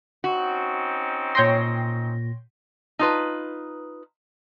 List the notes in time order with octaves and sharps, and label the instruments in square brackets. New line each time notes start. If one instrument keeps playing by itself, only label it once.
[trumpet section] C4 C#4 D#4 [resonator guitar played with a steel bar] F#4
[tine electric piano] A#2 A#6 [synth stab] C#5 G5 C6
[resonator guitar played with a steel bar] D#4 F4 B4